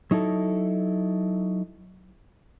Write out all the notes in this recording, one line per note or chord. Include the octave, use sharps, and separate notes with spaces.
F#3 D#4 E4 A4